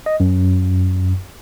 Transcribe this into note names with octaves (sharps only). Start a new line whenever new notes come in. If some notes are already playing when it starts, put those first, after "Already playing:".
D#5
F#2